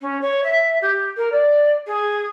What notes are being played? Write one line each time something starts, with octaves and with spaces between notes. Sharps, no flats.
C#4
C#5
E5
G4
A#4
D5
G#4